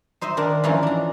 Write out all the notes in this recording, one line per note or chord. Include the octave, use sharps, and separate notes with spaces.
D#4 C5 D#5 E5
D#3 D4 A#4
E3 F3 C#4 D#4 F4 A#4
D4 A#5